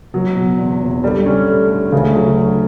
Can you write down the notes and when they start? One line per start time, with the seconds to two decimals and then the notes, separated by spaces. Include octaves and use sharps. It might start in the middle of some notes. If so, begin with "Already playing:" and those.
0.14 F#1 F#3
0.36 B2
0.58 E2
0.80 F#1
1.03 D3 G3
1.26 C#4
1.48 A3
1.70 D3
1.92 D2 C#3
2.15 F#3
2.38 D3